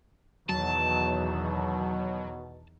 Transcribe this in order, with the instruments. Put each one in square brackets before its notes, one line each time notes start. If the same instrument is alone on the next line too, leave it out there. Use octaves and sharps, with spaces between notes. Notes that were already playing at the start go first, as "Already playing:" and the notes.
[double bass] E2 D#3 [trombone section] B2 [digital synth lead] F#3 [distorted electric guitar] A5